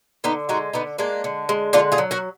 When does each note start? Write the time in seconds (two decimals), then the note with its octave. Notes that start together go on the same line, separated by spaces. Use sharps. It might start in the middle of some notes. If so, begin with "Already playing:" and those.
0.24 D3 B3 D#4
0.49 G#3 D#4 F#4
0.74 D3 B3 D#4
0.98 G#3 A#3 D4
1.24 D3
1.49 G#3
1.73 D3 D4 F4
1.92 F4 G#4
1.98 F#3
2.11 F#4 A#4